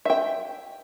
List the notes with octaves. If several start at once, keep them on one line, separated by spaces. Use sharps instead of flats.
E5 G5